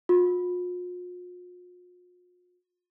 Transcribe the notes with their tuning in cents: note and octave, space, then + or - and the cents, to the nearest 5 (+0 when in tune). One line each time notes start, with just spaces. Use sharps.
F4 +45